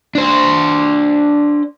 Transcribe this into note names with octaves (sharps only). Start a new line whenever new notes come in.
D4 C5